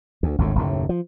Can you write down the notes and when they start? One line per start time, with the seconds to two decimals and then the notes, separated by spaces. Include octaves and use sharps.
0.23 D2
0.38 G#1 D2 A2
0.55 F#1 D#2 A2
0.89 F3